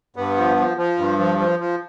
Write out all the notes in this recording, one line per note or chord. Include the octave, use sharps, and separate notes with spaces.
G2 B3
F3
F3
F3
G2
F3
F3
F3